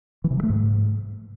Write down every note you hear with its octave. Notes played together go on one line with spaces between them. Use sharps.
E3
C3
F#3
A3
G#2